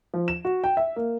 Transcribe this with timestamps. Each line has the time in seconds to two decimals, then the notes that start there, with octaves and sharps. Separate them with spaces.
0.14 F3
0.28 E7
0.45 F#4
0.64 G5
0.77 E5
0.96 A#3